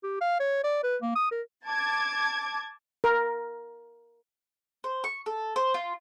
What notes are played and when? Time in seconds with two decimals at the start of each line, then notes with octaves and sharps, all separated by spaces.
0.03 G4
0.21 F5
0.40 C#5
0.64 D5
0.83 B4
1.02 A#3
1.15 D#6
1.31 A#4
1.66 A5 D6 G#6
3.04 A#4
4.84 C5
5.04 C#6
5.26 A4
5.56 C5
5.74 F4